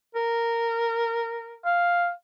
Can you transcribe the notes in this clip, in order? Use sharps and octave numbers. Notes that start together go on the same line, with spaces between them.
A#4
F5